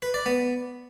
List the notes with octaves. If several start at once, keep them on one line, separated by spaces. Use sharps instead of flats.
B4
D5
B3